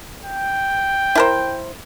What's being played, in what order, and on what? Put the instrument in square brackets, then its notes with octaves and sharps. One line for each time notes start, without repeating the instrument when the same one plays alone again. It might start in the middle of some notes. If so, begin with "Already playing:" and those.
[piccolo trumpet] G5
[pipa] E4 A#4 C5